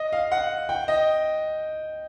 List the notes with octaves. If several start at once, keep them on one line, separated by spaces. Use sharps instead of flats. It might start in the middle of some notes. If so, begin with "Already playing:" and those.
Already playing: D#5
F5
F#5
G5
D#5